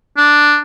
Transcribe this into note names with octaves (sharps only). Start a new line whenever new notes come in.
D4